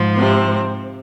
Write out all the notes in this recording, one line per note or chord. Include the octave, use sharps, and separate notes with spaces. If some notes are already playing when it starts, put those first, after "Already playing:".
Already playing: G#2 F3
C3 C4